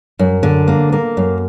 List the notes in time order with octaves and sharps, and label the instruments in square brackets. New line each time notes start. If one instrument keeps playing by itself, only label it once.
[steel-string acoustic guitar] F#2
D3
A#3
A#3
F#2